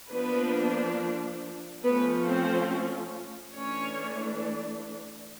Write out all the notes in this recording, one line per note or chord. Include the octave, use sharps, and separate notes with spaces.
F3 A#3 B3 D4 B4
F3 A3 B3 C#4 B4
C4 C5
E3 A3 C#4 D4 C#5